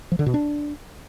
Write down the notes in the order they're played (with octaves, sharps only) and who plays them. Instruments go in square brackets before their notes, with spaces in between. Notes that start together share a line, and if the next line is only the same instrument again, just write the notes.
[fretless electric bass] F3
D3
B2
D4